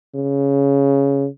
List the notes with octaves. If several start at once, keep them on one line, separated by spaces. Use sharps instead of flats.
C#3